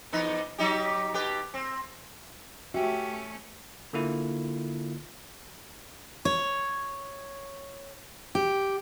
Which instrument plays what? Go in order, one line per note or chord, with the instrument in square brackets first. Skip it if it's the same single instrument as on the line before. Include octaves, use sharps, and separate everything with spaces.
[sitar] E2 D#4 B4
F#3 D#4 G4
B2 G4 B4
C4
[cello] A3 C#4 [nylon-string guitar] F#4 [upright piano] G4 E5
[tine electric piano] D3 A#3 E4 F4
[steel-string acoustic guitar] C#5
G4